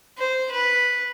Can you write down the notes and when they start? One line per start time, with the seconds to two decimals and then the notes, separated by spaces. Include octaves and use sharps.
0.18 C5
0.52 B4